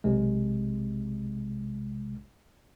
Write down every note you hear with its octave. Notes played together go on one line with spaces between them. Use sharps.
B1 C3 G#3